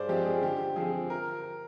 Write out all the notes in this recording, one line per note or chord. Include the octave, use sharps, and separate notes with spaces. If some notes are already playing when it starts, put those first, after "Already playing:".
Already playing: G2 G#4 C5 D5
F3 G#3 C4 G4
G#4
D3 G4
F3 C4 G#4
A#4